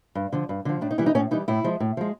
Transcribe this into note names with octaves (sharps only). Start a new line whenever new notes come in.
G2
D3 F3
G2
D3 F3
A2 D4
D#4
E3 G3 E4
D#4
A2 C#4
E3 G3 D#4
A2 E4
F3 G#3
A2
F3 G#3